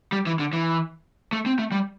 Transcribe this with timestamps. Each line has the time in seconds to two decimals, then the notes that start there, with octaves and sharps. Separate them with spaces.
0.12 G3
0.26 E3
0.39 D3
0.53 E3
1.33 A3
1.46 C4
1.59 A3
1.72 G3